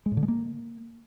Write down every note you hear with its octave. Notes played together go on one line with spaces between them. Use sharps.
G#3
A2
D3
G#3
A#3